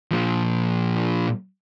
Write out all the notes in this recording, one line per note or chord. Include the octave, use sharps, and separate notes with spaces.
A#2 F3